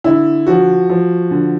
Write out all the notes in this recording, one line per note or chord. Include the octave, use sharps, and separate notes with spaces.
D3 E4
F3 F#4
F3
D3